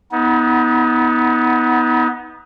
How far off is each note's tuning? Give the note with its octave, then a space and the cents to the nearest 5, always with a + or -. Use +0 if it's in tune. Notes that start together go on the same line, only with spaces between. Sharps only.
B3 +0 D#4 +35